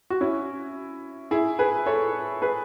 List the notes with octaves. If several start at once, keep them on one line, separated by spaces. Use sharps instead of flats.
F#4
C#4 E4
E4 G#4
G#4 B4
A4 C#5
G#4 B4